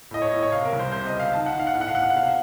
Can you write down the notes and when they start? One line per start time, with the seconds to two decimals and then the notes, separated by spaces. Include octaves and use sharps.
0.11 A2 D#5
0.22 C#5
0.32 A2 D#5
0.43 C#5
0.52 C3 F5
0.65 A#4
0.73 C2
0.79 C5
0.92 C3 C5
1.06 D#5
1.13 C#2
1.20 F5
1.33 D#3 A5
1.46 F#5
1.53 D#3
1.60 F5
1.67 F#5
1.74 A2 F5
1.81 F#5
1.88 F5
1.93 A2 F#5
2.03 F5
2.10 F#5
2.13 C3 F5
2.23 F#5